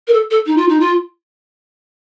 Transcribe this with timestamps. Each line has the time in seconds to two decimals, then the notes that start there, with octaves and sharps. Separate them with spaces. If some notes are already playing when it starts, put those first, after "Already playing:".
0.07 A#4
0.13 A4
0.30 A4
0.46 D#4
0.57 F4
0.68 D#4
0.80 F4